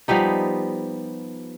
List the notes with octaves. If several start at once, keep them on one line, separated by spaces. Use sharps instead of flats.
F3 G3 B3 D#4